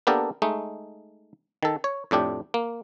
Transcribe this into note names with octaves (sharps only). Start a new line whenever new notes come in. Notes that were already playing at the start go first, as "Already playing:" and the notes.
A#3 B3 D4 G4 A4 A#4
G#3 A3 D#4
D#3 A4
C#5
F2 A2 D4 G4
A#3